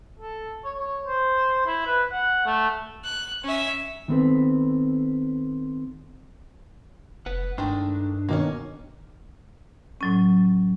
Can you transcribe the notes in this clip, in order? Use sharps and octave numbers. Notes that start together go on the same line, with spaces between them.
A4
C#5
C#5
C5
E4
B4
F#5
A3
F#6
C#4 E5
D#3 B3 C4 A4 B4
F1 B4 F#5
G2 D#3 G#3 A3 D4
B2 D#3 A#3 C#4
A2 F#3 C#4